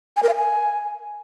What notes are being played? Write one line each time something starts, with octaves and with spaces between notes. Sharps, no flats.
G#5
A#4
F5
G#5